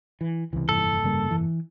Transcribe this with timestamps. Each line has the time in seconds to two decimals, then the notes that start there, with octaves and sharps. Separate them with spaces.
0.21 E3
0.53 C#2 C3 E3
0.69 F1 G2 A#2 A4
1.04 C#3 G3 A#3
1.31 E3